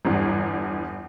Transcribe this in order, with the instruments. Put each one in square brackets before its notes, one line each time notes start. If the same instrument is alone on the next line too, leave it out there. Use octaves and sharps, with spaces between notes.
[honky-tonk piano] G1 E2 G2